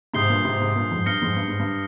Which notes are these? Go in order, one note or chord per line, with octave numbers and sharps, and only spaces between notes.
G#2 C3 D#6 G6 C7 G7
G2 A#2
G#2 C3
G#2 C3
G2 A#2
F2 G#2
G2 F6 A#6 C#7 G7
F2 G#2
G2
G#2
G2